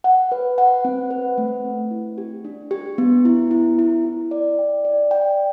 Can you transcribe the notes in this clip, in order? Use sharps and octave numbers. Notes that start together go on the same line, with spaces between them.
F#5
B4
F#5
C4
B4
A3
C4
E4
G4
D4
G4
B3
E4
E4
E4
E4
D5
G5
D5
G5